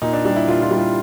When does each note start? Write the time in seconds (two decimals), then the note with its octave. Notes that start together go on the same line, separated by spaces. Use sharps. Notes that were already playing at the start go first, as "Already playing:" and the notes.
0.02 A#2 D#4
0.13 D4
0.25 G3 D4
0.36 E4
0.47 A#2 F4
0.62 F4
0.71 G3
0.78 F4